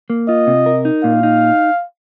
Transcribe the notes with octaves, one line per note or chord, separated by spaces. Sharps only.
A#3
F4 D#5
C3
A#4
D#4
A#2 F5
D#4